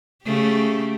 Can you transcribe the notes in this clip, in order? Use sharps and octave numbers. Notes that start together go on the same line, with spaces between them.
C#3 A3 G4